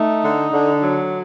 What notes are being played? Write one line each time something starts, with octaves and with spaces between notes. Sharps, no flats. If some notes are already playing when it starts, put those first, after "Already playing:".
Already playing: A3 D#4
D3
D3
F#3